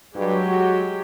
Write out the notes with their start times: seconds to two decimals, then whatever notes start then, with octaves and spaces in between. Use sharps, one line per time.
0.15 G2 F#3 G#3 G4
0.47 F#4